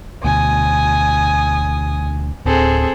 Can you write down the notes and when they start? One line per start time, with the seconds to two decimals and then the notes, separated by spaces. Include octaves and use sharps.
0.24 D2 B2 G#5 D#6
2.45 D1 C4 G#4 A4